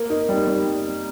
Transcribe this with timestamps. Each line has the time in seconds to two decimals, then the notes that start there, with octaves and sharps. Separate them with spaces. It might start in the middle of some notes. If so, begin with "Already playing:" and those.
Already playing: A#3
0.10 D#4
0.29 G3
0.47 G3